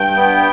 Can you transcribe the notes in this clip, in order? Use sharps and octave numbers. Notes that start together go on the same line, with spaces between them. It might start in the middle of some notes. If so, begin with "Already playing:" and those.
Already playing: G2 G5
B3